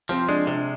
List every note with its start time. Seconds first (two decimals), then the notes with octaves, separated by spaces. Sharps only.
0.09 F3 C4
0.29 G#3 D4
0.47 C3 D4